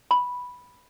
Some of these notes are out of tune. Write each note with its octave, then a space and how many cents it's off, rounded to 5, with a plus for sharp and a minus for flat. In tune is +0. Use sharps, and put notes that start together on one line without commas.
B5 -5